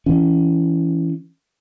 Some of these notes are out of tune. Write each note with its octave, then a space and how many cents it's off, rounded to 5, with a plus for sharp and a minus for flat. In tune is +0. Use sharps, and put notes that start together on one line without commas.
E3 +10 C#4 +10